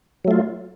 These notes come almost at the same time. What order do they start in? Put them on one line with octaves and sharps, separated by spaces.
F#3 A3 F4